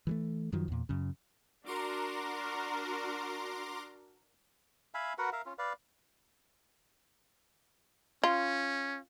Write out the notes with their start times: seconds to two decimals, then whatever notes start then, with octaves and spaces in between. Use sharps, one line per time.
0.07 E3 G3 A3
0.52 F#2 D#3 F3 F#3
0.68 E2 A#2
0.89 F#2 C#3
1.66 D4 F#4 A#4 A#5 C6 D6
4.94 E5 F5 G#5 B5
5.18 F#4 A#4 B4 F#5
5.33 A#4 E5 F5
5.46 C#4 F4
5.58 B4 D5 F5
8.24 C#4 F4